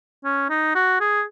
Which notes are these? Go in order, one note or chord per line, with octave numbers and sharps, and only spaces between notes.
C#4
D#4
F#4
G#4